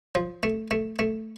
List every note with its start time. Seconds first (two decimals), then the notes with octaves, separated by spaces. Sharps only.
0.15 F3
0.43 A3
0.71 A3
0.99 A3